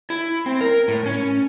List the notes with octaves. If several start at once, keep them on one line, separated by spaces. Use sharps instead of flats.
E4
C4
A#4
A2
C#4